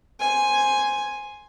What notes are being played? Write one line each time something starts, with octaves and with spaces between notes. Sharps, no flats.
C5 G#5